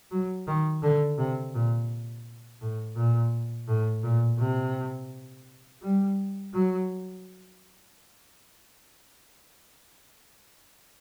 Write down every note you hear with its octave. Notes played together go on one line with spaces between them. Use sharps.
F#3
D#3
D3
C3
A#2
A2
A#2
A2
A#2
C3
G3
F#3